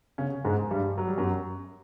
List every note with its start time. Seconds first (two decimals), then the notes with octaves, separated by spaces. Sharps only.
0.18 C#3 C#4
0.44 G#2 G#3
0.71 G2 G3
0.98 F#3
1.08 G3
1.18 F#2 F#3